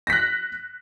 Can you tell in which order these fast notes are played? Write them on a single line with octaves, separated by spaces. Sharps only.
A#6 B6 F#6